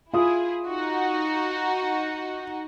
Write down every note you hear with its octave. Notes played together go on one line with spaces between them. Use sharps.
E4 F4 G#4 D#6
D#4 F#4